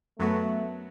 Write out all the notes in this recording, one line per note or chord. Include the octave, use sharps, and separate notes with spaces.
F#2 F#3 A3 B3 F#4